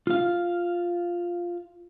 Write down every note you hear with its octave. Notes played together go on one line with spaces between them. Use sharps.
F4 F5